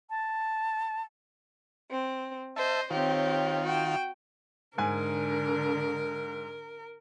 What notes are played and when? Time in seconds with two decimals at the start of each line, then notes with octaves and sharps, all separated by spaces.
0.10 A5
1.89 C4
2.56 C5 D#5 E5 A5
2.91 D#3 C4 F4 G4 C#5
3.64 F#4 G5
4.78 G#2 D3 A#4 G#5